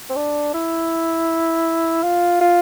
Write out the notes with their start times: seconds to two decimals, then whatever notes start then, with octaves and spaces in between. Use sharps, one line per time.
0.10 C4
0.16 D4
0.54 E4
2.03 F4
2.41 F4